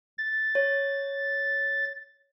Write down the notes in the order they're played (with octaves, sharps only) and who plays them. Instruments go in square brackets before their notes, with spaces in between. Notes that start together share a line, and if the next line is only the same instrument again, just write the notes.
[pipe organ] A6
[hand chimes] C#5